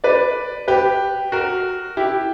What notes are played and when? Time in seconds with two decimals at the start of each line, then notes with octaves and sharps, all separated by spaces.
0.04 B4 D5
0.68 G4 B4
1.32 F#4 A#4
1.97 E4 G4